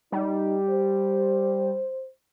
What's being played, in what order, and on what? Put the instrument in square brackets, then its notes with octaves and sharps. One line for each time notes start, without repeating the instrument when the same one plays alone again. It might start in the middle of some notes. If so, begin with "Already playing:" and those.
[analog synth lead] G3 [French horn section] D#4
[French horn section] C5